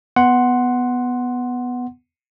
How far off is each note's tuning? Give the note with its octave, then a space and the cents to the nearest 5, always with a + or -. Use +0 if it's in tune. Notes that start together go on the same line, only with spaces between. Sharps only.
B3 +0 F#5 +0 C6 +0